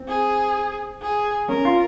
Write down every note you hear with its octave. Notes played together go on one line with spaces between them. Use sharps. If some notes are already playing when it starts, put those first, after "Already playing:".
Already playing: C4
G#4
G#4
C#4 A#4
F4